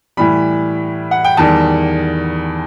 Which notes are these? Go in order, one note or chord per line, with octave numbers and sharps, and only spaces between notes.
A2 E3 G3 B5
F#5
G5
E2 D#3 G3 A5